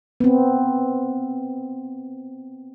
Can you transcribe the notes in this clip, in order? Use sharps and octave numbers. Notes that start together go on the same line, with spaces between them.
B3 C4